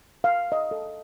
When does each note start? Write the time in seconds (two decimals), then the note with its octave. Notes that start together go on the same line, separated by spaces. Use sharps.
0.24 F5
0.52 D#5
0.71 A4